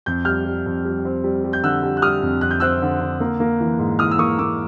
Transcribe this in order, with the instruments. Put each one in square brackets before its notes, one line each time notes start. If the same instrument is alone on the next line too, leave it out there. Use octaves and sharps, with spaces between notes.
[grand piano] F2 G6
G3 F6 G6
G3
F2
G3
C4
G3
G3
G6
D3 E6 F#6
G3
F#6
G3 D#6 F6
F2
F2 F#6
G6
C4 E6 F#6
D3
D3
A#3
A#3
E3
G#2
E3 D#6 F6
E6
A#3 C#6 D#6
A#3 D6 E6